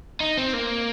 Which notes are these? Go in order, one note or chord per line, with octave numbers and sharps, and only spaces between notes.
D#4
C4
A#3